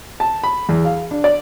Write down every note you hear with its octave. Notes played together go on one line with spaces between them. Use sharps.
A5
B5
E2
F5
D4
D5